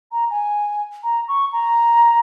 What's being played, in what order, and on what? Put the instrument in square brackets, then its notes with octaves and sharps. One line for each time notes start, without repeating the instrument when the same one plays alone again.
[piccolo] A#5
G#5
A#5
C#6
A#5